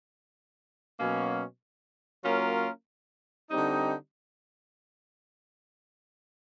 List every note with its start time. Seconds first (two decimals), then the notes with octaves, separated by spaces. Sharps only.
0.99 B2 F#3 A#3 C#4
2.24 F#3 A#3 C#4 F4 A#4
3.50 D3 G3 C4 D#4